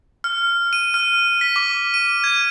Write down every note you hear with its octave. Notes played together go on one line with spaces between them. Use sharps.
F6
D#7
F6
B6
D6
D#7
G#6